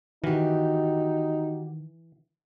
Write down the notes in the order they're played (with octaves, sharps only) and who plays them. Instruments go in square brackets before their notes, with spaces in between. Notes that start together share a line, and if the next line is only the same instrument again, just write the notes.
[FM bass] D#3 [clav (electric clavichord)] E3 [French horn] D#4 [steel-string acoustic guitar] F#4 G4